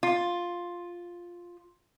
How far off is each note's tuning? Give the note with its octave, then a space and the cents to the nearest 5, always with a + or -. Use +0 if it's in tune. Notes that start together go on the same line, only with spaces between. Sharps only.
F4 +5